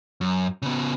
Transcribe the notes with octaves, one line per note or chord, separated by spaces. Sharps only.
F#2
C#3 B3